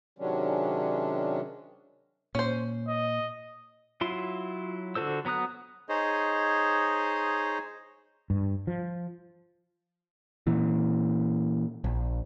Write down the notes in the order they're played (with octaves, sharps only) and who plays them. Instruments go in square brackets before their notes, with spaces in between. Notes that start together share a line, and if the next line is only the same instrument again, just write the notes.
[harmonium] C3 D#3 F#3 G#3 C#4 D4
[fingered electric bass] A#2 [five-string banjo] C#4 C5
[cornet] D#5
[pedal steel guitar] F#3 E4 F4 C6
D3 F#4 A4 C5 E6
F#3 B3 A#5 D#6 F#6
[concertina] D#4 G#4 C5 C#5 D#5
[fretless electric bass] G2
F3
[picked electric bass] A#2 E3
A#1